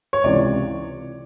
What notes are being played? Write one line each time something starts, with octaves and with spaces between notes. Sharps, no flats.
C#5
C#2 C3 E3 D5